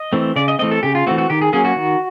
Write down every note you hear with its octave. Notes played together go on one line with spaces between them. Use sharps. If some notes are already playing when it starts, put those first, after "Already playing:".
Already playing: D#5
E3 A3 C4
C#3 D5
D#5
E3 A3 C4 D#5
A4
C#3 G4
F4
E3 A3 C4 F#4
F#4
D#3 G4
G#4
F#3 A#3 C#4 G#4
F#4
D#3